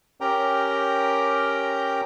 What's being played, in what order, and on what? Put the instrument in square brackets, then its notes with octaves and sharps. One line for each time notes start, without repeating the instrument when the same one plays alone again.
[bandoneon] C#4 G4 A#4 G5 A#5